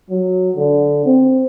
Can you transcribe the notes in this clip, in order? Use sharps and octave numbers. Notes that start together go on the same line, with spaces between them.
F#3
D3
C4